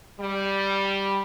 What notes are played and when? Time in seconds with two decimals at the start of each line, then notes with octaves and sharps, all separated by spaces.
0.21 G3